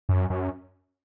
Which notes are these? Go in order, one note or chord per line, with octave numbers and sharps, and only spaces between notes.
F#2
F#2